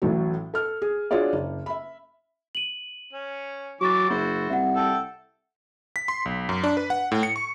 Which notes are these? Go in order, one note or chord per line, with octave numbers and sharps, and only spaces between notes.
A1 A2 F#3
A4 F6
G#4
D4 F4 F#4 G#4 C#5 D5
F#1
E5 B5
D#7 F#7
C#4
E3 F#3 C#6 D6 A6
F#1 E4 F#4 C5
C2 E5 F#5
A4 G5
B6
C6
B1
F#2
D4
B4
F#5
A2
C#7
C#6